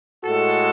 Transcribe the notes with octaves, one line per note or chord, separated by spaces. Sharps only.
A2 G#3 F#4 A4